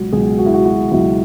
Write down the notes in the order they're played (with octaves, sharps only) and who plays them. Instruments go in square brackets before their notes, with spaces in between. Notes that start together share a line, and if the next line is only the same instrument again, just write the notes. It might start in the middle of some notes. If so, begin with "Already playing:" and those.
Already playing: [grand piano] C#2 B2 F#3
C#2 B2 F#3 G#4
F#4
E4
F#4
F#4
C#2 B2 F#3 E4